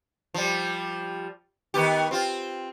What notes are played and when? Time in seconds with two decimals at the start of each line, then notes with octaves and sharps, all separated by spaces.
0.34 F3 G3
1.74 D#3 B3 G4
2.11 C4 F4